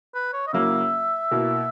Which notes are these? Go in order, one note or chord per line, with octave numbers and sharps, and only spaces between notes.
B4
C#5
D#5
C#3 F#3 A#3 E4 E5
B2 A#3 E4